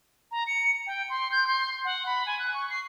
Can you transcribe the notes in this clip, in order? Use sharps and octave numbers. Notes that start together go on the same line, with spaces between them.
A#5
C#7
G5
C6
G6
C6
F#5
B5
G#5
F#6
C#6
C7